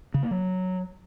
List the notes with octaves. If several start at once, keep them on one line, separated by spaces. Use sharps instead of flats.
C#3
A#3
F#3